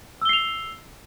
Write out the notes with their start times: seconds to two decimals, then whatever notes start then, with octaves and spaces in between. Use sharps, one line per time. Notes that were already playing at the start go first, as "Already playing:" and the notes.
0.22 E6
0.25 G7
0.29 C7
0.33 F7